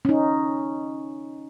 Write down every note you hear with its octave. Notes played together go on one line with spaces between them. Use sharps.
C#4 D#4